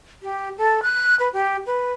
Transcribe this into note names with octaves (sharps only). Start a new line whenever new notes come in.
G4
A4
F#6
B4
G4
B4